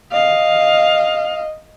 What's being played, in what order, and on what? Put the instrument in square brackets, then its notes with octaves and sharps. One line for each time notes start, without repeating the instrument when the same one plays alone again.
[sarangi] D#5 [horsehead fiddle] F5